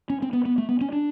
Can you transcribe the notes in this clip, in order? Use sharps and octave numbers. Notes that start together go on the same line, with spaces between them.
C#4
C4
B3
B3
A3
B3
C#4
D4